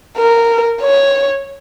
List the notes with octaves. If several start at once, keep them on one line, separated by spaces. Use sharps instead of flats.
A#4
C#5